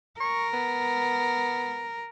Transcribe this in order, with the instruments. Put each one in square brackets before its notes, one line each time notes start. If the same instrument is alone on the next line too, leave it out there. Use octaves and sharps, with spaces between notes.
[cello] A#4 [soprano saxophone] C#6
[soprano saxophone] B3